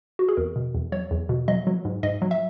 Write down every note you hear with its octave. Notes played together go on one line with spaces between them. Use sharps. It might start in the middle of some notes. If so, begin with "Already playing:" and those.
F#4
G#4
E2 A#4
B2
E2
F#3 C#5
E2
B2
F#3 D#5
F#3
G#2
G#2 D#5
F#3
E5